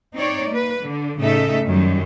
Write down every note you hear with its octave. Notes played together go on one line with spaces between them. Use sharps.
C4 D#4 C#5 D5
A#3 B4
D3
A2 C#3 A3 D#4 A4 E5
F#2 D#3 G3